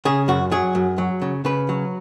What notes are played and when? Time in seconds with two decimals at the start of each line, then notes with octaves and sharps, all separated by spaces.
0.05 C#3 G#4
0.28 F#2 F#4
0.52 F#3 G#4
0.75 F#2
0.98 F#3
1.22 C#3
1.45 C#3 B4
1.69 F#3